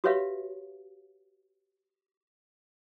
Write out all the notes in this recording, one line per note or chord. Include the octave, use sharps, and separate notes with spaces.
F#4 G4 B4 C#5 E5 F5